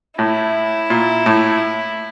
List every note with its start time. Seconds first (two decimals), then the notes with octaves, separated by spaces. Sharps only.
0.18 A2 E4
0.90 A#2
1.26 A2